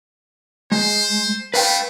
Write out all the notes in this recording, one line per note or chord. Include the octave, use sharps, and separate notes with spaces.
G#3 C5
A3 B4 F5 G5